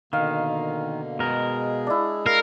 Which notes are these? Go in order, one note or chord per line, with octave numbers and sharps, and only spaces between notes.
B2 D3 D#3 A#3 F5
B2 G#3 G#4 A#4
D4 E4
A#4 F5